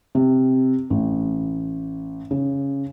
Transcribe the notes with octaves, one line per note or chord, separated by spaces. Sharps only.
C3
A1
C#3